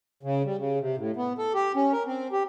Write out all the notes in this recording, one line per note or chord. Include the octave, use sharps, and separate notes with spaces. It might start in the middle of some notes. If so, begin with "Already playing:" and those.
C#3
G3
C#3
C3
A2
B3
A4
G4
C#4
A#4
C4
G4